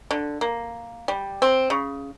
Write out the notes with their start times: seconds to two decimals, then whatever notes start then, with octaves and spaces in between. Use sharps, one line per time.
0.11 D3
0.41 A#3
1.08 G3
1.42 C4
1.70 C#3